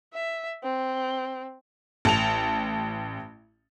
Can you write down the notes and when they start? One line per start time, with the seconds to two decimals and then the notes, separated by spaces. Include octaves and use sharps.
0.14 E5
0.63 C4
2.05 A1 A5 F7